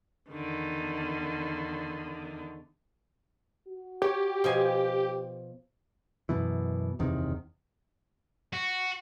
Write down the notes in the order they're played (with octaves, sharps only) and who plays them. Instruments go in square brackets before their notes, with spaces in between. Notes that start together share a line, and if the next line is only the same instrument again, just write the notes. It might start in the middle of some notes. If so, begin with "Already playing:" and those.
[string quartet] E2 D3 D#3
[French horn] F#4
[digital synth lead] G4 [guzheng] C#5
[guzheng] B2 F3 G#5
[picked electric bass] F#2 B2 E3
F#1 E2 C3 D#3
[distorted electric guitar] F#4